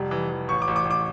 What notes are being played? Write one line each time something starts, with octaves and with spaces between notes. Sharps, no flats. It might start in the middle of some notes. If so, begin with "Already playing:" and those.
Already playing: F1 G3
E3
E3
A1 C#6
D6
A1
D6
A1
D6